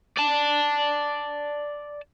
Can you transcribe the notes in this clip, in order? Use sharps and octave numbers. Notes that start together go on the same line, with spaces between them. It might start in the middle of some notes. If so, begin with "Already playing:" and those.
D5 A5